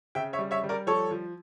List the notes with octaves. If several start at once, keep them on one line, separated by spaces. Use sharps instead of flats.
C#3 E5 G5
C#5 E5
G3
C#5 E5
G3
A#4 D5
F3 A4 C#5
F3